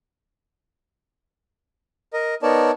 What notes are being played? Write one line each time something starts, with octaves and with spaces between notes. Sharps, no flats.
A#4 D#5
B3 D#4 A#4 C#5 D5 A5